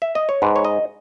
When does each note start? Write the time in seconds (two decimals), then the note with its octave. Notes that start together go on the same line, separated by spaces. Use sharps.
0.02 E5
0.15 D#5
0.29 C#5
0.42 G#2 B4
0.56 C#5
0.65 D#5